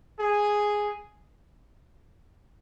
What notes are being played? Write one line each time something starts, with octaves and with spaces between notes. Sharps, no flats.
G#4